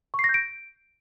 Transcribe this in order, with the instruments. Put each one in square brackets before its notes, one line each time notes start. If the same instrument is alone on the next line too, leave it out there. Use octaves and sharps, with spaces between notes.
[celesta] C#6
C7
A#6
G6
D7